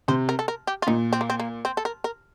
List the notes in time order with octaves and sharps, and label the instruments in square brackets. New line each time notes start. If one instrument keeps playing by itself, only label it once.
[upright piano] C3 [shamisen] C5
[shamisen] A#4
A4
A#4
G4
F4
[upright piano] A#2 [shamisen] D#4
[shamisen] C4
A#3
C4
A#3
C4
A4
A#4
A#4